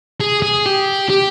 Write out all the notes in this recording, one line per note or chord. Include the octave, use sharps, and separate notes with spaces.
G#4
G#4
G4
G4